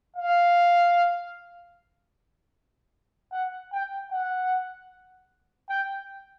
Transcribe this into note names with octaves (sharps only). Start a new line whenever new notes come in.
F5
F#5
G5
F#5
G5